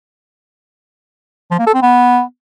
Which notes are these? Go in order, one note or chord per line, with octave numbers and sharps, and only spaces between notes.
F3
A#3
A4
C4
B3